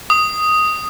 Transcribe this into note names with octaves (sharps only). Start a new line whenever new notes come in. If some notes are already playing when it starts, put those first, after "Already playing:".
D#6